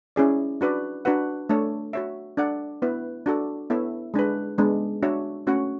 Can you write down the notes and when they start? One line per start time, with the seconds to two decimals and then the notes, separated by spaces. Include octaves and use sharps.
0.16 C#4 E4 G#4 D5
0.61 D4 F#4 B4 D5
1.05 D4 F#4 B4 F#5
1.49 A3 D4 A4 C#5
1.93 F#4 C#5 E5
2.37 D4 A4 D5 F#5
2.82 B3 E4 B4
3.26 D4 F#4 A4 D5
3.70 B3 E4 A4 C#5 E5
4.14 G#3 D4 G#4 B4
4.58 G#3 B3 D4
5.03 D4 F#4 C#5 E5
5.47 A3 C#4 F#4 C#5 F#5